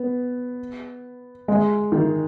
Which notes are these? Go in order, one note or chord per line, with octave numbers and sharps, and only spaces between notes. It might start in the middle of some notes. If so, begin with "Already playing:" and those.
Already playing: B3
G#3
D#3